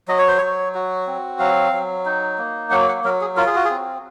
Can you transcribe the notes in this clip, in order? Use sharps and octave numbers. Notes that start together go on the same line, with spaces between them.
F#3 D#5
C#5
C5
F#3 C#5
F#4
C4
F#3 F5
F#3
D#4
A#3
F#3 F#5
F#5
F#3 A#4
G#4
F4 A#4
G#4
F#4
G#4
C4